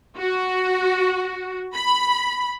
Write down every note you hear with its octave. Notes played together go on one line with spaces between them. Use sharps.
F#4
B5